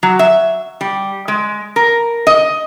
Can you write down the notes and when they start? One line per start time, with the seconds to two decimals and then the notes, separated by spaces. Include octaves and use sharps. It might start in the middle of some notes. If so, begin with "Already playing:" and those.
0.03 F#3
0.19 E5
0.81 G3
1.28 G#3
1.76 A#4
2.27 D#5